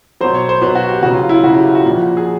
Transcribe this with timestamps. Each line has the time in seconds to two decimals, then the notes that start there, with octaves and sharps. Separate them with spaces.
0.21 B2 F#3 C5
0.35 C#5
0.49 C5
0.62 B2 F#3 B4
0.75 F#4
0.89 G4
1.02 C#3 F#4
1.06 F#3
1.13 F4
1.23 F4
1.29 E4
1.34 F4
1.44 C#3 F#3 F#4
1.54 G4
1.64 F4
1.75 F#4
1.85 A#2 F3
2.17 G#4